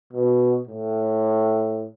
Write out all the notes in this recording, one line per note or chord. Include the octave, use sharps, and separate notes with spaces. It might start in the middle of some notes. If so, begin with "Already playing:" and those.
B2
A2